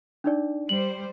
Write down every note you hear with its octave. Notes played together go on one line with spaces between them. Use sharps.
D4 D#4 D5
G3 C5 F#7